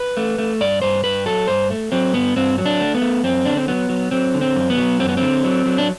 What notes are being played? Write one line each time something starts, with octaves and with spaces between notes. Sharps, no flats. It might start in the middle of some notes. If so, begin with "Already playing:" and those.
Already playing: B4
A3
A3
G2 D5
G2 C5
G2 B4
F#3 A4
G2 C5
A3
F#3 C4
G2 B3
G2 C4
F#3
D4
A3
B3
A3
F#2 C4
D3 D4
C4
F#3 B3
F#3
F#3 C4
D3
C4
F#2
B3
F#3
F#2 C4
B3
D3 C4
F#3
F#3
D4